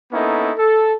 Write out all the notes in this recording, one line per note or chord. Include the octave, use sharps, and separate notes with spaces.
A#3 B3 C#4 D#4 E4 A4
A4